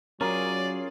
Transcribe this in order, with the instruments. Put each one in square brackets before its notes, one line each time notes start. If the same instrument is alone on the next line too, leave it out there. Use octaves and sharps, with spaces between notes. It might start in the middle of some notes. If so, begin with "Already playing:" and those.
[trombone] F#3 [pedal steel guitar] C#4 F4 G#4 [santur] A#4 [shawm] D5